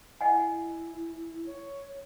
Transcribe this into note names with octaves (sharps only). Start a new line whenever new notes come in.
E4 D#5 F#5 G#5
C#5